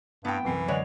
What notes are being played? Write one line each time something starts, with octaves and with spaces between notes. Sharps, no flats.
G2 A3 B3 C4 E4 G5
C2 F#2 E3 F#3 C7
D3 G#3 C#5 D5 F#5 B5